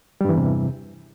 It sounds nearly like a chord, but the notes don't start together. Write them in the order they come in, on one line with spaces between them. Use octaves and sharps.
G3 G2 E3 E2 C3